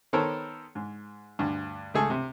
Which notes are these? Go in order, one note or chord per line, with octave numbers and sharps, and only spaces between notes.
D#3 B3 A4 A#4 C5 C#5
G#2
D2 G2
C#2 A3 G#4 A4
C3